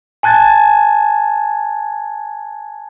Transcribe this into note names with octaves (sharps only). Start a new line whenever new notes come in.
G#5 A5 F#6 G#6 A6